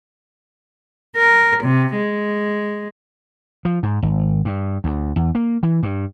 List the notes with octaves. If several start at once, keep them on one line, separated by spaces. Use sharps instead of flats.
A#4
C3
G#3
F3
G#2
G#1
G2
D2
E2
A#3
E3
G2